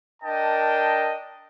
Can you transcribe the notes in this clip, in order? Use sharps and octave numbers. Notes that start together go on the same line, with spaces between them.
D4 A#4 D#5 G5 A5